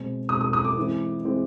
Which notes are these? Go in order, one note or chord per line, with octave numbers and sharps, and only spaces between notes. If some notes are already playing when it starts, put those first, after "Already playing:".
Already playing: B2 G#3 C4
B2 G#3 C4 D#6
D#6
D#6
D6
E3 G#3 C4
E3 G#3 C4